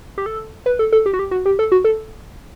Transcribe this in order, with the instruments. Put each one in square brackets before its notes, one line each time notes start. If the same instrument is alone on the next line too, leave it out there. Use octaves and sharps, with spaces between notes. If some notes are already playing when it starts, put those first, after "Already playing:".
[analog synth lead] G4
A4
B4
A4
A4
G4
F#4
G4
F#4
G4
A4
F#4
A4